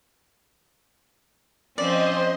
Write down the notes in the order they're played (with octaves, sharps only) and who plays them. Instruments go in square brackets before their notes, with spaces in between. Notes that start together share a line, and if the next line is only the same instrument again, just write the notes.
[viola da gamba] F3 C4 C#4 [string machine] C5 D#5 C6 [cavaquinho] D5